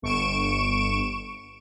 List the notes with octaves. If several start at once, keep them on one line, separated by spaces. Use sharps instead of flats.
G1 C#6 D7 E7